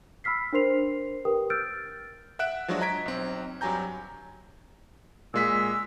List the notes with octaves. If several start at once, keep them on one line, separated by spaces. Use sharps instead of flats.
B5 E6 F6 B6 C7
D4 A#4 C5 C6 C7 F7
G4 A#4 B4 G5 D#6
E6 F6 G6 A6 D7
E5 F#5 F#6 D7 E7
F3 F#3 G#3 D4 F#4
D#5 A#5 G#6 B6 D7
B1 C4
G2 F#3 G4 G#5 A#5 G6
A#2 G#3 E6 B6